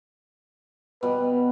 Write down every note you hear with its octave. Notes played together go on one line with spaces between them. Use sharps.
B2 G3 B4